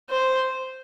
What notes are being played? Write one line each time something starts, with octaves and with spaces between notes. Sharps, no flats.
C5